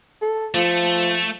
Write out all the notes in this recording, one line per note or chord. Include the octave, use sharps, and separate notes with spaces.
A4
F3 A3